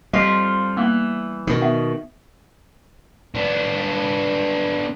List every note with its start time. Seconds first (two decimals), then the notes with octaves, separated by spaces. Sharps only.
0.13 F2 F3 G3 F4 D#5
0.77 E3 A#3 B3
1.47 B2 D#3
1.62 B3 E5
3.35 B3 D4